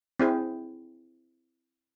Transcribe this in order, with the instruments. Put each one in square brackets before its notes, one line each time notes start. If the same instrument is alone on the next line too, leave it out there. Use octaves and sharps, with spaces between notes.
[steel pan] C4 E4 G#4